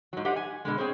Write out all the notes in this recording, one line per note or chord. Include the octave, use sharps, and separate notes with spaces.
G#2 F#3
G4 C5 D5 D#5 F#5
G#5
B2 D3 G#3
C4 G#4 C5 C#5